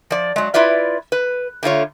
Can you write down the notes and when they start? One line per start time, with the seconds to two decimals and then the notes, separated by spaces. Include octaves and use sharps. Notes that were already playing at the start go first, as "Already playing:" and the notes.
0.10 F3 D5
0.36 F#3 G#3
0.54 E4 F4 B4 D5 E5
1.12 B4
1.63 D3 A3 F4 C#5